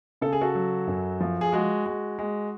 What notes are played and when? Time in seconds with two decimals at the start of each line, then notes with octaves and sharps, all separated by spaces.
0.21 C#3 A4
0.32 G#4
0.41 F#4 A4
0.55 F#3
0.87 F#2
1.20 F3
1.41 G#4
1.52 G#3 F#4
1.86 G#3
2.19 G#3